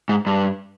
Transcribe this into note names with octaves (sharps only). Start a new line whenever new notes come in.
G#2
G2